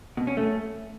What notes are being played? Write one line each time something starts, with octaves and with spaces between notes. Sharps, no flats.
B2
C#4
A3